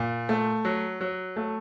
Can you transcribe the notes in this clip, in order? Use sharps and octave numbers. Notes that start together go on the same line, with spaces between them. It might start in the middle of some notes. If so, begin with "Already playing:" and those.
Already playing: A#2
A3
F#3
F#3
A3